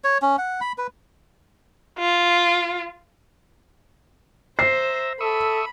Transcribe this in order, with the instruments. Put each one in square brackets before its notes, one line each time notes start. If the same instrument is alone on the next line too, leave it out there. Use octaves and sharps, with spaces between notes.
[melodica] C#5
C#4
F#5
B5
B4
[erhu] F4
[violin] C5 [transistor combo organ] E5 A#5 [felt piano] C7
[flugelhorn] A4 [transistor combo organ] E5 C#6 D#6 [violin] B5